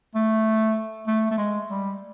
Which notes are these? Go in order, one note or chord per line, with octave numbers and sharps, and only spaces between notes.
A3
A3
A3
G#3
G3